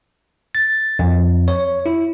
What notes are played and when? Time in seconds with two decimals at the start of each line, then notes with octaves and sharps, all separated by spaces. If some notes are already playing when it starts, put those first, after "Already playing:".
0.55 A6
0.99 F2
1.48 C#5
1.86 E4